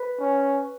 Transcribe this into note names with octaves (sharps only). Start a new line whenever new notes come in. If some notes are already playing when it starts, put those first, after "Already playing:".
Already playing: B4
C#4